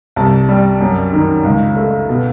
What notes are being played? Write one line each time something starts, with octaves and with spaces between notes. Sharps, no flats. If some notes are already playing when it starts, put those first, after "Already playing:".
C2 A5
G3
F#2
D#3
C#2
A3
B2